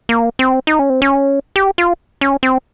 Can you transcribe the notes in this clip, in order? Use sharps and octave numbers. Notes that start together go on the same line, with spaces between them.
A#3
C4
D#4
C#4
C4
C#4
G4
F4
C#4
C4